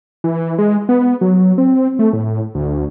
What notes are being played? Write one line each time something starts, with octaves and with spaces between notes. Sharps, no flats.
E3
G#3
B3
F#3
C4
A3
A2
D2